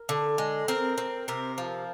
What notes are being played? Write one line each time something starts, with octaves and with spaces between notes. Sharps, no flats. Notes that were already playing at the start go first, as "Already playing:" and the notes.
Already playing: A#4
D3
G#3
C4 A#4
C4
C3 A#4
F3